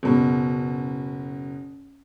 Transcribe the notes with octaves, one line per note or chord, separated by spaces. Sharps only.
F#1 B2